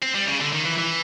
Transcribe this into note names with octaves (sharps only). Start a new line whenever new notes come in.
C4
G3
C#3
D3
D#3
E3
E3